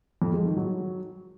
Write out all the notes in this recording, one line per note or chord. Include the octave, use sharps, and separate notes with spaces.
F2
G#3
D#3
F#3